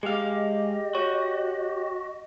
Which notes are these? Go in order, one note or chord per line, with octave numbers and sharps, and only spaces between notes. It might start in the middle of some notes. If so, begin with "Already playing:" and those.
G#3 G4 G#4 D#5 F5
F#4 C#5